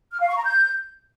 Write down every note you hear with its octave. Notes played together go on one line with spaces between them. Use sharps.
F6
F5
C#6
A#5
G6